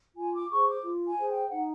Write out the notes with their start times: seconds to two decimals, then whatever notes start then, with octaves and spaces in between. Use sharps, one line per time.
0.17 F4 G#5
0.34 D6
0.51 G#4 C5 C#6
0.68 D6
0.84 F4
1.06 G#5
1.17 G#4 C5
1.29 G5
1.50 D#4 F#5